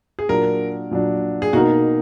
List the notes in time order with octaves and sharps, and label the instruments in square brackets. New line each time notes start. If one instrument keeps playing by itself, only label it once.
[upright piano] G#4
[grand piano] A#2 F#3 D4 [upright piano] A#4
[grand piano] A#2 F#3 D4
[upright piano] G#4
[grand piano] B2 A#3 D#4 A#4 [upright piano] F#4